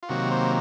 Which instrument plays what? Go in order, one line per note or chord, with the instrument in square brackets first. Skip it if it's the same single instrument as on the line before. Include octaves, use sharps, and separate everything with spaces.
[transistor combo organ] F4
C3 D#3 F#3 A#3 F#4
C5